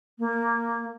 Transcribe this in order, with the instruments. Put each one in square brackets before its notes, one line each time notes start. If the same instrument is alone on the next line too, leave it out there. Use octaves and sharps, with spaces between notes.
[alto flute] A#3